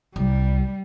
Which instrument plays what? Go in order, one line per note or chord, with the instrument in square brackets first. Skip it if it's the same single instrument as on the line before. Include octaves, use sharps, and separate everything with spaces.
[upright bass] C2 [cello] G3